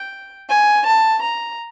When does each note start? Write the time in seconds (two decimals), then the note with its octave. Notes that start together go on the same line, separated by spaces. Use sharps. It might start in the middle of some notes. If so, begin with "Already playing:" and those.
Already playing: G5
0.48 G#5
0.84 A5
1.21 A#5